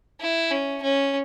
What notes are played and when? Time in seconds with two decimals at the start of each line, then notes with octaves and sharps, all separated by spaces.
0.21 E4
0.50 C#4
0.83 C#4